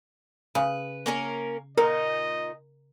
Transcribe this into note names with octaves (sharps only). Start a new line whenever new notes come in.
C#3 B4
A#3 C#4 A#4
A#2 D#4 A#4 D#5